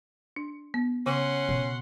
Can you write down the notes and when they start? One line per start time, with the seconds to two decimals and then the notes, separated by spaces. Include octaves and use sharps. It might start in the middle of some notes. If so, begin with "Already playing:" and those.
0.36 D4
0.74 B3
1.06 C#3 C#4 F#5 C6
1.49 B2